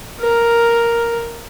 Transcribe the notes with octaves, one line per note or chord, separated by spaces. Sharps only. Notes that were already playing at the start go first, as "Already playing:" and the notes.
A#4